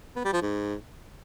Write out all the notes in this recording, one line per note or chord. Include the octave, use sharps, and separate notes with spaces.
B3
G3
F3
G#2